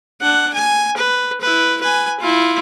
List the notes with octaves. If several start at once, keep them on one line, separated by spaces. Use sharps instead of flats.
D4 F#5
G#5
B4
E4 B4
B4 G#5
E4 F4